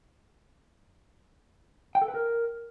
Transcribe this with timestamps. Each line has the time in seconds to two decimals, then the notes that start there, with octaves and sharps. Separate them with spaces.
1.95 G5
2.02 A4
2.08 B4
2.14 A#4